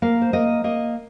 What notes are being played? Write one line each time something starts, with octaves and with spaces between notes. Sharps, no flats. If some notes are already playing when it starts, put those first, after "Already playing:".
A#3 F5
C5
A#3 D#5
A#3 D#5